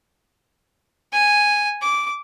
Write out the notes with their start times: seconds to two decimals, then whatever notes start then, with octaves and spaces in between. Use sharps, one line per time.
1.13 G#5
1.81 D6